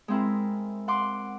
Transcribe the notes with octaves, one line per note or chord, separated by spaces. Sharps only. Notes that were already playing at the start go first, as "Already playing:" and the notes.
G#3 C4 E4 A#4
F#5 C6 D6